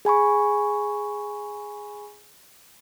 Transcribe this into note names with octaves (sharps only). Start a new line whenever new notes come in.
G#4 G#5 B5 C#6